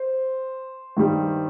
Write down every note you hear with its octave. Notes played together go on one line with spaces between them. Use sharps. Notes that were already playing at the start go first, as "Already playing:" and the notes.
Already playing: C5
G2 D#3 G3